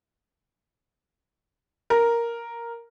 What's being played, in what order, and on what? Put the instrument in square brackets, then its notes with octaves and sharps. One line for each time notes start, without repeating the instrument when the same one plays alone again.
[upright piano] A#4